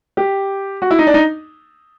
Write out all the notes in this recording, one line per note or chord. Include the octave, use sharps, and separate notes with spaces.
G4
F#4
E4
D#4
D4
D#4